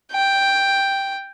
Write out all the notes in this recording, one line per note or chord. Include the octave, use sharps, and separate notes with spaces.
G5